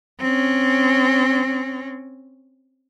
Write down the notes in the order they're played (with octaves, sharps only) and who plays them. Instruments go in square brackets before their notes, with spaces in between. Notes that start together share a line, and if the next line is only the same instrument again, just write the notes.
[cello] C4 C#4